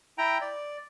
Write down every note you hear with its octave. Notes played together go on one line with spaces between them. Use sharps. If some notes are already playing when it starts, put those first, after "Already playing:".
E4 G5 A#5
D5